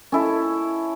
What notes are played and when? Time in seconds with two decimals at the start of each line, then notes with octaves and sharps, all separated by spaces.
0.12 C#4 E4 A4